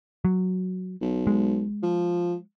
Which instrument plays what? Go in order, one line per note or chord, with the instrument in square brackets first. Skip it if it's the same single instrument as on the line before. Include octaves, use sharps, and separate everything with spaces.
[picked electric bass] F#3
[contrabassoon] B1
[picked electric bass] G#3
[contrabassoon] F3